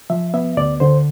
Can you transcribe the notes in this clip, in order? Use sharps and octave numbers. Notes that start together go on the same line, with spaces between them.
F3 E5
B3 E5
D2 D5
D3 C5